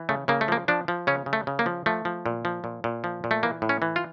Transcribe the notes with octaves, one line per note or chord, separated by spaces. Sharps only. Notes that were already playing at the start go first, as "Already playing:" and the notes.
Already playing: E3
C#3 A3
C#3 A#3
A3
F3 A#3
F3 D4
F3
C#3 C#4
C#3
A3
C#3
A#3
F3
F3 A3
F3
A#2
F3
A#2
A#2
F3
A#2
A3
E3 A#3
A2
C#4
E3
F4